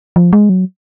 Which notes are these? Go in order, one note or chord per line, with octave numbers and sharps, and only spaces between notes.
F3
G#3
F#3